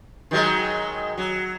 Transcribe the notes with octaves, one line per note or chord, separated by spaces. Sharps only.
D#3 F#3 G#3
F#3